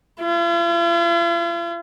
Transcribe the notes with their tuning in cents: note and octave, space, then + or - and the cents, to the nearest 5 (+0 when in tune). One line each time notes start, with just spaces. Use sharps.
F4 -45